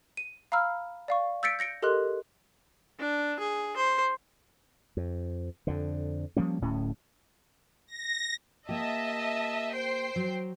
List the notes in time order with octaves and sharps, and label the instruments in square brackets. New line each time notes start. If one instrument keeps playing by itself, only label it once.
[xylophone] D#7
F5 A#5 B5 E6 F6
D5 F5 C#6
E6 G6 A6 B6 C#7 D7
G6 A#6 C#7 D7
G4 A4 A#4 D#5 C6 F#6
[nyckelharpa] D4
G#4
C5
[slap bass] F2
F2 D3
F3 G3 A#3 C#4
D1 A2 C#4
[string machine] A#6
[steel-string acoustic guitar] A#3 G4 [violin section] D#5 E5 A5
[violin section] C5 G5 C7
[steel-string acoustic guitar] F#3